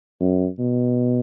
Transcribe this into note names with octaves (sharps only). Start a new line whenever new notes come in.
F#2
B2